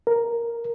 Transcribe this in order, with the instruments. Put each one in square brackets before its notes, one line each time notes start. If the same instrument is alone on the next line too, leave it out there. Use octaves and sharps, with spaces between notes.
[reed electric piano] A#4